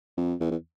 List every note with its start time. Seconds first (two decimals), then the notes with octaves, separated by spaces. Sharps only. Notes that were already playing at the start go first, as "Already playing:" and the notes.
0.17 F2
0.40 E2
0.51 E2